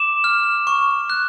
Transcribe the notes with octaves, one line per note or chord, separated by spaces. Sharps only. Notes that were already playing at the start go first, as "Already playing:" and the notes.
Already playing: D6 E7
F6
C#6
F#6